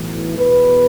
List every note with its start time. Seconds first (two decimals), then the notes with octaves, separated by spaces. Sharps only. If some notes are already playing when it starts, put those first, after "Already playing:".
Already playing: B1 A2 E3
0.38 E2 B2 B4